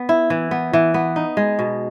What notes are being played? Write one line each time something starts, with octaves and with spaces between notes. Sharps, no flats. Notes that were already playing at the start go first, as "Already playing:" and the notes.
Already playing: B3
E4
E3
B3
E3
B3
D#4
G#3
B2